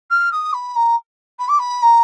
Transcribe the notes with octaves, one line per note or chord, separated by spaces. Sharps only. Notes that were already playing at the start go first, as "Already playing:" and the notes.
F6
D#6
B5
A#5
B5
D6
B5
A#5